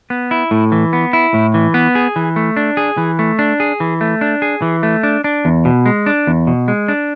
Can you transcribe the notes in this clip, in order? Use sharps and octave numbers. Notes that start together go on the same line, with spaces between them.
B3
E4
A2
E3
B3
E4
A2
E3
B3
G#4
E3
A3
D4
G#4
E3
A3
D4
G#4
E3
A3
D4
G#4
E3
A3
D4
D4
E2
B2
G#3
D4
E2
B2
G#3
D4